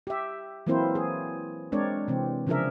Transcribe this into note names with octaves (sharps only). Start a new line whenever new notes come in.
G4 E5
E3 F#3 A#3 C4 E4 C5
G#4
G#3 C4 D4 A#4 C#5 D5
C3 E3 C4
C#3 F3 D4 G#4 A#4 E5